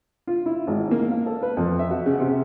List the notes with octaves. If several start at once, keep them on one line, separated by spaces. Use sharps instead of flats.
F4
E4
G#1
A#3
F5
A4
B4
F2
E5
F#4
C#3
C3